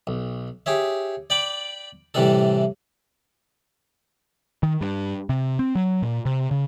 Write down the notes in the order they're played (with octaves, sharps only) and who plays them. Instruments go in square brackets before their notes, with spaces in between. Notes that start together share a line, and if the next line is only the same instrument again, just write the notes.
[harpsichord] B1
G4 G#4 C#5 E5
D5 G5 B5 D6
A2 C3 E3 G3 D4 A4
[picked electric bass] D#3
G2
C3
C4
F#3
A#2
C3
C#3